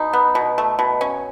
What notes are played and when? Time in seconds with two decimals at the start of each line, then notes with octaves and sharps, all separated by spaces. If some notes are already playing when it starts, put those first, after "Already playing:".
Already playing: B2 D#4
0.13 B3
0.35 B2
0.58 A3
0.79 B2
1.01 C#4